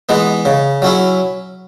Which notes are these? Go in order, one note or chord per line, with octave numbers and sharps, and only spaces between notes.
E3 G#3 B3
C#3
F#3 C#4 E4